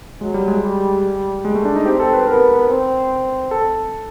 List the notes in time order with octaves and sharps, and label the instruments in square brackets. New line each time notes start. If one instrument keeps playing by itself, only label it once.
[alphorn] F#3 [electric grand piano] G#3
[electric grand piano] G3
G#3
[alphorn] G3
[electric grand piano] G#3
A3
D4
D#4
[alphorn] C4 [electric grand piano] G4
[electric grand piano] A4
B4
[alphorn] B3 [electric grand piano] A#4
[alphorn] C4
[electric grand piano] A4